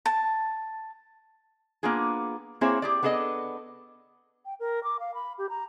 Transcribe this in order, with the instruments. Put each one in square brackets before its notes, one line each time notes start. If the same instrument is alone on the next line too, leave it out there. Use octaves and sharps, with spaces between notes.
[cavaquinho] A5
[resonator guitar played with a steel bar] A#3 B3 D4 F4 G#4
A#3 C4 E4 G#4 C5 C#5
G4 G#4 D5
B3 D4 G#4 A4 D#5
[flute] G5
A#4
D6
F5
B5
G4
A#5